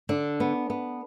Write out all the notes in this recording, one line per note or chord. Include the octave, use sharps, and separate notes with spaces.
D3 D4
B3
B3